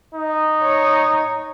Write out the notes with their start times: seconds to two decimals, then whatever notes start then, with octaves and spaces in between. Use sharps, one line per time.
0.15 D#4
0.63 C#5